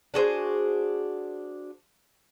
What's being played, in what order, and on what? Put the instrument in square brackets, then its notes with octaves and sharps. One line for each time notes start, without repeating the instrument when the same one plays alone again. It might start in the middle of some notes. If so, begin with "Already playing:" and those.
[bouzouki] D4 F#4 G#4 C5